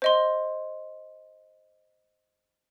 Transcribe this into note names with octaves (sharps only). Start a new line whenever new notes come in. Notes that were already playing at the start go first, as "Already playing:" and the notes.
C5 D#5 C6